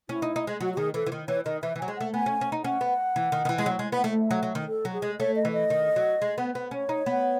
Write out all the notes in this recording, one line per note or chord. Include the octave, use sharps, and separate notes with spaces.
C#4 E4
D#4
D#4
G#3
F#3 F#4
F#4
D#3 G#4
E3 A4
E3
D#3
E3 C#5
D#3 D#5
E3 E5
E3
F#3 G#5
G#3
A3 F#5
B3 G#5
C#4
C#4
D#4
C#4 F#5
B3
E3
D#3
D#3
E3
G#3
F#3
G#3
B3
A3
E5
F#3
F#3
D#3
A4
F#3
G#4
G#3
A3 C#5
D#5
E3
D#5
D#3
F#3
G#3
B3
B3
C#4 C#5
D#4
B3